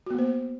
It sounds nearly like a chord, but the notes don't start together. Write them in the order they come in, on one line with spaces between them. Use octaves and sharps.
F#4 B3 A#3 C5